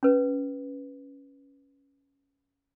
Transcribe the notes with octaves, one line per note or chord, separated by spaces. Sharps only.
C#4 B4